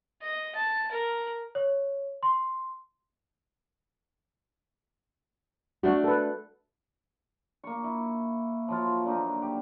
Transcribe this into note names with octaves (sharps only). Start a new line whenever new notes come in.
D#5
A5
A#4
C#5
C6
A3 D4 F#4
A4 B4
A#3 C#6
E4
F3 F#3 F4
D3 F#3 A#3 D#4
G4